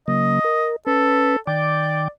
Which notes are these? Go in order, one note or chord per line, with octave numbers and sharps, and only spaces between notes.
C#3 F#3 A#3 D#5
A#4
C#4 A4 B4
D#3 D5 G5 D6